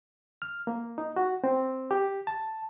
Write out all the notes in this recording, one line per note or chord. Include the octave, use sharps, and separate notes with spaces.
F6
A#3
D#4
F#4
C4
G4
A5